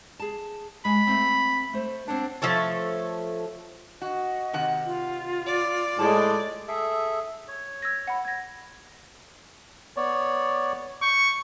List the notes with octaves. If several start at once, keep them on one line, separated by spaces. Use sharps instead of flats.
G#4 A5
G#3 G#5 B5
A3 C4
A3 C5
C4 D4 C#5 F#5
F3 A3 A4 C#5
F#4 D#5
C3 D#3 F#5
F4
D5
A2 G#3 A5
G#4 A4 E5
C#5
E6 G#6 A#6
F#5 B5
G#6 A#6
B3 C#5 D5
C#6 G6